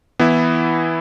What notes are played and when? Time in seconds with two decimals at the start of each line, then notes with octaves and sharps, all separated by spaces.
0.19 E3 B3 E4